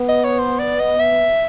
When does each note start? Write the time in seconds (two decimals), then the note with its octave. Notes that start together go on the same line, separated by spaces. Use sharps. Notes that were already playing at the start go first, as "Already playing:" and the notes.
Already playing: B3
0.09 D#5
0.24 C#5
0.39 C5
0.59 D5
0.80 D#5
0.99 E5